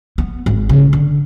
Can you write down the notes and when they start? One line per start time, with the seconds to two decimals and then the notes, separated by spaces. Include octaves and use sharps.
0.18 B3
0.46 G#1
0.69 C#3
0.93 D3